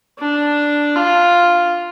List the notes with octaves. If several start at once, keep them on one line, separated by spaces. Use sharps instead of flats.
D4
F4